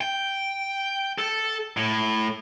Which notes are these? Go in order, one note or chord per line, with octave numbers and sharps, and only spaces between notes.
G5
A4
A2